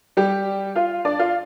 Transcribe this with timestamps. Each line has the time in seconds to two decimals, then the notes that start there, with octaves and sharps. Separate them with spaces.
0.17 G3 G4
0.76 F4 F5
1.05 D4 D5
1.19 F4 F5